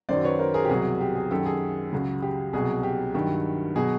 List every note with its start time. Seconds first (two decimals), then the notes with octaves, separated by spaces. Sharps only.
0.09 F#2 D#3 F#3 C5 D5
0.24 B4 C#5
0.39 A#4 C5
0.54 G#4 A#4
0.65 G4
0.69 C2 B2 F#3 G#4
1.01 G4
1.15 G#4
1.31 F#2 D#3 F#3 G4 A4
1.46 G#4
1.93 C#2 C#3 F#3
2.22 G4
2.53 C2 B2 F#3 G#4
2.83 G4
3.14 G2 D#3 F#3 G4
3.75 B2 F#3 G#4